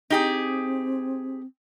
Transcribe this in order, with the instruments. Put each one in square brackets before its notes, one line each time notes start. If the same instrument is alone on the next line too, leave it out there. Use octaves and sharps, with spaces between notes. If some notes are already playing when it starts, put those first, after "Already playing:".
[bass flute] C4 [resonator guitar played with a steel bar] D#4 G4 G#4